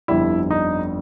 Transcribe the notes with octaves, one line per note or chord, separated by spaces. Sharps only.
G1 F2 D3 G3 E4
D#4